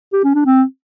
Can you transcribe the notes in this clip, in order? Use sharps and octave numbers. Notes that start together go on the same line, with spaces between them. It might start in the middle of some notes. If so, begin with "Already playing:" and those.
G4
C#4
D4
C4